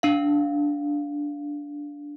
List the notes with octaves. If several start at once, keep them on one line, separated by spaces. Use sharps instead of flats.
D4 F5